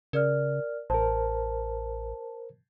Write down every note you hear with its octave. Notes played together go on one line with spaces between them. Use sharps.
C#3 A#4 D5 F6
A1 A#4 C5 A5